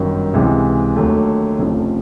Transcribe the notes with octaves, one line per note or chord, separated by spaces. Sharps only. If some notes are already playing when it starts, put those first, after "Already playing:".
Already playing: G1 F#2 D#3
C#2 C3 E3 G#3
D#2 D3 F#3 A3
F1 F2 C#3 F3 A3